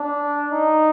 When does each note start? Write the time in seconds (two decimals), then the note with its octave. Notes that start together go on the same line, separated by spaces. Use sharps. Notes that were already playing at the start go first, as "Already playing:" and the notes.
Already playing: D4
0.51 D#4